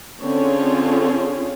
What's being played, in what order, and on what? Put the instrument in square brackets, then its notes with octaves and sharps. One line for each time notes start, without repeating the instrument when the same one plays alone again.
[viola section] D3 C4 C#4 F4 G#4 C#5